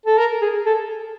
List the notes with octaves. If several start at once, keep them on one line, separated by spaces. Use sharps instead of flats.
A4
A#4
G#4
A4